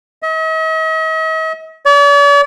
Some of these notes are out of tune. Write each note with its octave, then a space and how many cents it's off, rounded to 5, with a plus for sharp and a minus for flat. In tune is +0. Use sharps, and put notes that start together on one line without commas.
D#5 +45
D5 -45